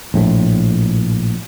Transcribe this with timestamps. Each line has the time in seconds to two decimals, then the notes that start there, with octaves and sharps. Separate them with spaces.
0.14 A#1 A2